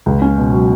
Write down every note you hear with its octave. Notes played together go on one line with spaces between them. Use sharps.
C#2
C#4
B2
F#3